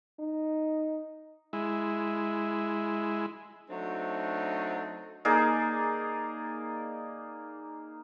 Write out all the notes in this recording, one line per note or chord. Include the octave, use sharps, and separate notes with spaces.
D#4
G#3 E4
F#3 A3 C4 D4 D#4
A#3 D#4 G#4 D5